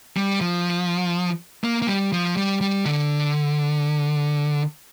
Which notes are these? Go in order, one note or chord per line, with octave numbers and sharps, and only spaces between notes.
G3
F3
A#3
A#3
G3
F3
G3
G3
D3